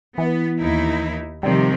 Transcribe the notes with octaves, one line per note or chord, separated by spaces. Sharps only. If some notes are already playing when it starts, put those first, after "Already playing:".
E3 B3
D#2 D#4 E4
C3 D#3 F3 G3